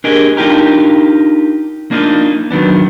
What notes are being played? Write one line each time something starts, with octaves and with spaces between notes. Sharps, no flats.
D4 G4 G#4 A#4 D#5
D4 D#4 F4 G4 A#4
A#3 D4 D#4 F4
D#3 F#3 B3 D4